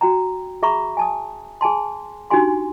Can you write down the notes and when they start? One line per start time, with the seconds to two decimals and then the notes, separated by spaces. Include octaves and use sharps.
0.01 F#4 G5 A#5
0.63 G#4 E5 A#5 B5 C#6
0.97 G#5 A5 D#6
1.61 G#4 G#5 A5 C6
2.30 D4 D#4 F#4 G4 G#5 C6